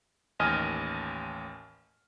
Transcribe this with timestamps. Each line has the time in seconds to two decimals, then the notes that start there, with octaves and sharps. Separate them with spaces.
0.39 A1 D#2 D#5 G#5 F6